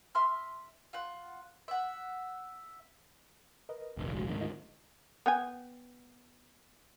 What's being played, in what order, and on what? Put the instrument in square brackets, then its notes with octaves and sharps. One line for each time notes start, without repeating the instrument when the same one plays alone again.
[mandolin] E5 C6 F6
F4 F#5
E5 F#5
[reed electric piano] A#4 B4 D#5
[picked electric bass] F1 A#1 D#2
[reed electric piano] G#3 F#4
[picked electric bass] D2 G#2 D#3 [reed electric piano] B2 D3 C4
[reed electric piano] D#4 F4 D#5
[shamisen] B3 G5 G#5